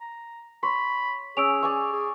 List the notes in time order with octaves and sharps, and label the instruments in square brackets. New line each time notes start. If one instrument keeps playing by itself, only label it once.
[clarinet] A#5
[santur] C#5 [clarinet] B5 [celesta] C6
[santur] C#4 [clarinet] G#4 [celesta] E6 D7 F7
[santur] D5 G#5 C#6
[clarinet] G#4